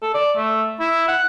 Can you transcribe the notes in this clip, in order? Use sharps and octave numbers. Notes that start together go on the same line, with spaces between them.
A4
D5
A3
E4
F#5